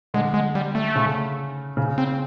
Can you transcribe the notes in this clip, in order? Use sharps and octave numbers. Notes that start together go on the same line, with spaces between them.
D3 G#3
G#3
G3
A3
C#3
C#3
C4